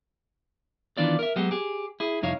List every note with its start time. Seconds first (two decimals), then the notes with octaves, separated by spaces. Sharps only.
0.97 D#3 E3 B3 D4 F4 D5
1.19 A#4 E5
1.36 F#3 G#3 B3 G4
1.51 G4 G#4
2.00 E4 G#4
2.22 C2 F2 D#4 E4 C#5 F5